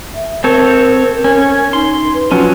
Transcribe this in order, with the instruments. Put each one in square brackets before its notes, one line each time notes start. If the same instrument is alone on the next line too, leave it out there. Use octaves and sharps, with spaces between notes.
[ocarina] E5
[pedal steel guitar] C4 A4 C#5 [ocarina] A#4
[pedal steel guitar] C#4
[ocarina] D#4 [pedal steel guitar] C6
[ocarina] B4
[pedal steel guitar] F3 F#3 C#4 [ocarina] F4